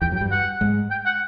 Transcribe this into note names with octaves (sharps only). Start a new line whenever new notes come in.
E2 E3 G5
F#2 F#3
G5
G2 G3
F#5
G#2 G#3
G5
F#5